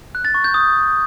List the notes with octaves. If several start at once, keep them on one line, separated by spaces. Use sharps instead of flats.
F#6
A6
C#6
G6
D#6